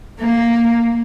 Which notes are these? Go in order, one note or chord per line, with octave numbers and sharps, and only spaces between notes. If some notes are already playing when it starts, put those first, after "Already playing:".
A#3